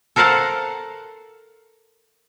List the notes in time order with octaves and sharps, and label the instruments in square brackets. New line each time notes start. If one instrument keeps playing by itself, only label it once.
[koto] A4 A#4 C5 F5 F#5 A5